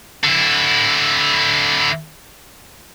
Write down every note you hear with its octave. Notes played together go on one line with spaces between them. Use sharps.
D3 E4